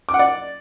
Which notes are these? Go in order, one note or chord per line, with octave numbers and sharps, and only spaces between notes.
D6
F#5
D5